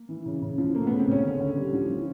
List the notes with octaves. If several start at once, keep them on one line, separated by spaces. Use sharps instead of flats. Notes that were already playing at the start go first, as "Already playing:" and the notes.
Already playing: A#3
E3
C#3
C#3
F3
A3 A#3
C#3 B3
C4
C#3 C#4
D3
D3
G3
F3
F3